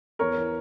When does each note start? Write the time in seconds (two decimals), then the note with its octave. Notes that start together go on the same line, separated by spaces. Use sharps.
0.19 E2 A#4 C#5
0.37 E3